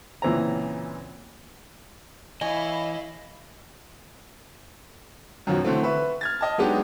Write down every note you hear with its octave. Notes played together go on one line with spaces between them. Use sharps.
C#2 A#2 E3 C4 A#5
E3 E4 C#5 D#5 F5 G#5
F#2 B2 D#3 F3 F#3
D3 E3 A3 C4
B4 E5 C#6
F6 G#6 A6
D#5 A5
F#3 G#3 B3 D4 D#4 G4